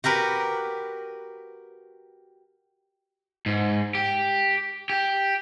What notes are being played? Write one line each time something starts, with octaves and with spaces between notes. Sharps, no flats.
F#4 G4 A#4 B4
G#2
G4
G4